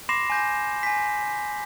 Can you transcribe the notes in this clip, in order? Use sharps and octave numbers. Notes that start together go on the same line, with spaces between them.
B5 C6 D6 A#6 C7 E7
G#5 G6 A#6
G#5 B6